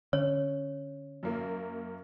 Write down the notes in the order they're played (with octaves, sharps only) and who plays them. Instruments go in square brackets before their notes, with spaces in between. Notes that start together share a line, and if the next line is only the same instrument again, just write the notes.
[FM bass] D3 [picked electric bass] C#4 [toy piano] C#5
[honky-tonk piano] F#2 A#3